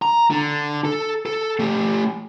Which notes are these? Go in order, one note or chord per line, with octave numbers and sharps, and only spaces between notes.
A#5
D3
A4
A4
A3 G4